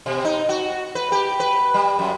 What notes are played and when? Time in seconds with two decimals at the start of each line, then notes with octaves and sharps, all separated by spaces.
0.06 B2
0.25 D#4
0.49 F#4
0.95 B4
1.12 G4
1.40 B4
1.74 G3
1.99 F#2